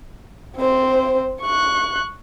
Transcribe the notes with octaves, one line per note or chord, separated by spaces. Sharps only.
C4 C5
C#6 F#6